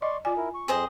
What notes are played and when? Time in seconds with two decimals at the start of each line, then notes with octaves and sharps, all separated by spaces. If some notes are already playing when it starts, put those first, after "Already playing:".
0.02 D5 D#5 C6 C#6
0.25 F4 D5 G#5
0.37 E4 A#4
0.55 C#6
0.68 F2 C4 G#4 C5 D#5